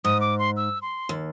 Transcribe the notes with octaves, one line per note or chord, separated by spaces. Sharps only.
G#2 D#6
D6
C6
E6
C6
D#2